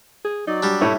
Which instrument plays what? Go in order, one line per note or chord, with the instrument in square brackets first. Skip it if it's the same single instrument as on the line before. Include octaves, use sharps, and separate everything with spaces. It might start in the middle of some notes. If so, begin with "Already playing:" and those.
[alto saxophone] G#4
[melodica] F#3 D5 [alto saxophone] D#4
[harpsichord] G3 D4 [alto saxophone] G4
[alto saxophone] A3 [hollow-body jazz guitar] E4 C#5 E5